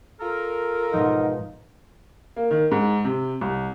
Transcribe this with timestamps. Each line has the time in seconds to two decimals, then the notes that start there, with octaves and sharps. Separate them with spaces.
0.20 F4 A4 A#4
0.93 G#2 B2 F3 D#4
2.36 A#3
2.51 D#3
2.71 G#2
3.05 C3
3.41 C2